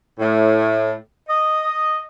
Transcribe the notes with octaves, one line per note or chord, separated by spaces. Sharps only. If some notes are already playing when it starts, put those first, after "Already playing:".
A2
D#5